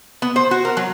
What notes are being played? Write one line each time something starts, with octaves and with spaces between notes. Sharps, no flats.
B3
C5
F#4
A#4
F#3